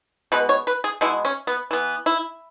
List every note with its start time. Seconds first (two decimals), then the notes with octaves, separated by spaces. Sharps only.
0.32 B2 G#3 B3 B4
0.49 C#5
0.67 B4
0.84 G#4
1.01 B2 G#3 B3 E4
1.25 C#4
1.47 B3
1.71 E3 B3
2.06 E4